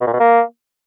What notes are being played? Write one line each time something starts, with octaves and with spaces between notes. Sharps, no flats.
B2
A#2
B2
A#3